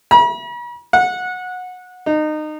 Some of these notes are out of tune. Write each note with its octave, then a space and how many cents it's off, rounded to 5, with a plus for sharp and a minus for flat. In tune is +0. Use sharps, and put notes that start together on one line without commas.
B5 -45
F#5 -20
D#4 -25